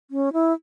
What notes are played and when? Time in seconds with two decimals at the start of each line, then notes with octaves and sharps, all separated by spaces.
0.11 C#4
0.33 E4